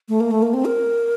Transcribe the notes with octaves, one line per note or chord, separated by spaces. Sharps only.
A3
A#3
A3
A#3
C4
A#4